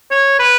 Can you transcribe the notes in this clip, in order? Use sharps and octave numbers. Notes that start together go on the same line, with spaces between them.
C#5
B4